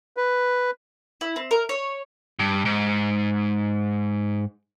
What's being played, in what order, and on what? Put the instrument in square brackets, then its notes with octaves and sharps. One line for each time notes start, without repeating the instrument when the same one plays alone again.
[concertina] B4
[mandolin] E4
C4
A#4
C#5
[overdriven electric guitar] G2
G#2